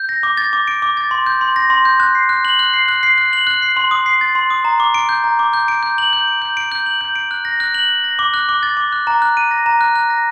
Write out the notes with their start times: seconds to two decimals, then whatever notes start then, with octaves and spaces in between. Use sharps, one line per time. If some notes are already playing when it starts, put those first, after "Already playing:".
Already playing: G6
0.09 A#6
0.23 D6
0.37 A6
0.53 D6
0.68 D7
0.82 D6
0.97 A6
1.11 C6
1.26 G6
1.41 C6
1.56 A#6
1.70 C6
1.85 G6
2.00 F#6
2.15 C7
2.29 F#6
2.45 F#7
2.59 F#6
2.74 C7
2.88 F#6
3.03 C7
3.18 F#6
3.33 F#7
3.47 F#6
3.62 C7
3.77 C6
3.91 D#6
4.06 C7
4.21 A6
4.35 C6
4.50 D#6
4.65 A#5
4.80 D6
4.94 D7
5.09 G6
5.24 A#5
5.39 D6
5.54 G6
5.68 D7
5.83 G6
5.98 F#7
6.13 G6
6.27 D7
6.42 G6
6.57 D7
6.72 G6
6.86 F#7
7.01 G6
7.15 D7
7.31 F#6
7.45 A#6
7.60 F#6
7.74 F#7
7.89 F#6
8.04 A#6
8.19 D6
8.34 F#6
8.49 D6
8.63 A6
8.77 D6
8.92 F#6
9.07 A#5
9.22 F#6
9.37 D#7
9.51 A#6
9.66 A#5
9.81 F#6
9.96 F#6
10.10 A#6